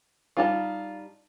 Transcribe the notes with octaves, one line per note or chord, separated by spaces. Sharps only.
G3 D#4 F4 A5